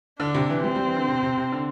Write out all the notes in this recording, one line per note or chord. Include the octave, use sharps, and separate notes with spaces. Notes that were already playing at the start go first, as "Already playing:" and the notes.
D3 D4
C3
E3
G3 C4
G3
E3
D3
C3
C3
C3
D3